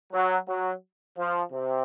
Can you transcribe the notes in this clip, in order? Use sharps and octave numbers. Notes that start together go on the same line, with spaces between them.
F#3
F#3
F3
C3